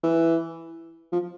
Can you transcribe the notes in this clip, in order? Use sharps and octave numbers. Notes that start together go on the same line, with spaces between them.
E3
F3